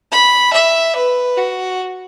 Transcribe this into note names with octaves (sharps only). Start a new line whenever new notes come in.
B5
E5
B4
F#4